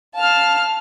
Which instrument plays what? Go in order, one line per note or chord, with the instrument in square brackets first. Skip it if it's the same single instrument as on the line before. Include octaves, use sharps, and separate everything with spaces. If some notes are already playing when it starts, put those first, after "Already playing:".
[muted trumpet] F5 [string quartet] A5 F6